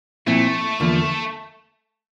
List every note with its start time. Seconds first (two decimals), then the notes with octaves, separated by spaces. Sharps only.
0.27 A#2 F3 A3 C4 E4
0.80 E2 D3 F3 A#3